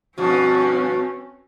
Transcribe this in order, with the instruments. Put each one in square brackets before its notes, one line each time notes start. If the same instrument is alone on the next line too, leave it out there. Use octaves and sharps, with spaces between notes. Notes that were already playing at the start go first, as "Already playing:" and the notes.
[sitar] G2 B2 F3 [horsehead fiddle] C4 C#4 [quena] F#4